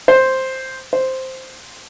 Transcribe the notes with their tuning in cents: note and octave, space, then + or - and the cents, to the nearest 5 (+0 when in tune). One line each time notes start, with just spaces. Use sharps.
C5 +5
C5 +0